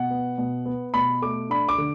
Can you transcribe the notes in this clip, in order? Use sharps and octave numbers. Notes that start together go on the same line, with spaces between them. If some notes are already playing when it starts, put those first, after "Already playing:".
Already playing: B2 F#5
B3
B2
B3
B2 B5
A3 D6
D4 B5
D6
D3